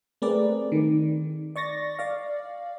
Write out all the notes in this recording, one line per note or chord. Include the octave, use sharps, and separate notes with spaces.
A3 C4 G#4 A#4 B4 D5
D#3
D5 C#6 A6 A#6
D5 F5